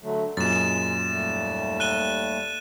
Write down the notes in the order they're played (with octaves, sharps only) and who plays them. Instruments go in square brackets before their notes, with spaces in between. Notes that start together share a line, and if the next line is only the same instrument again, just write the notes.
[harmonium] D3 F#3 A3
[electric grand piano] F#2 A#2 [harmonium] G#3 [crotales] A6 E7
[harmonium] D#2 G3 A3
[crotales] F#6 D#7 G7